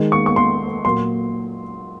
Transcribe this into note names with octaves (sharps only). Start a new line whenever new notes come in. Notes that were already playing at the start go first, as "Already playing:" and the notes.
Already playing: D#3 G#3
C#6
C#6
C6
A#2 F#3 A#3 C6